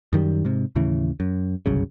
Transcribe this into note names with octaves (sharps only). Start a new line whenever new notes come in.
F#2 D#3 F#3 G3
G#2 C3
D#2 A2 C#3 E3
F#2
G1 C2 F#2 C#3